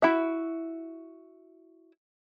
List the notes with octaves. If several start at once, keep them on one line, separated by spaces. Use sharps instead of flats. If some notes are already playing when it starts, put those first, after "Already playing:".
E4 F#4 E5